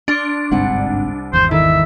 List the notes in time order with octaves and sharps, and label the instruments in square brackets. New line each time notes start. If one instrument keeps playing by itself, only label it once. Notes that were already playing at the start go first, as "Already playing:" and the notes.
[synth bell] D4 [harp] C6 C#6 F6
[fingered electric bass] G1 G#2 C4 [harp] C2 F#5
[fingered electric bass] G#1 E2 [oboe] C5
[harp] D#3 E4 A4 [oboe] E5